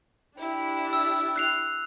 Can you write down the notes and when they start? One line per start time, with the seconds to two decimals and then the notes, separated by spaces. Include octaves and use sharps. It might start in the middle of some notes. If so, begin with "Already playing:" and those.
0.37 D4 E4 G4
0.93 E6
1.36 F#6 C7 F7